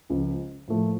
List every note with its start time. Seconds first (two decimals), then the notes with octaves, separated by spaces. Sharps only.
0.10 C#2 C#3 F3
0.68 A2 F3 A3